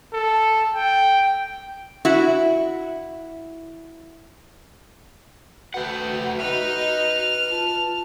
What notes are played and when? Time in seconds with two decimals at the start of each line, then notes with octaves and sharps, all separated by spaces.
0.13 A4
0.74 G5
2.05 E4 F#4
5.74 A3 F#4 B4 F#5 G5
6.40 D#4 B4 D#5 F6
7.50 F4 A5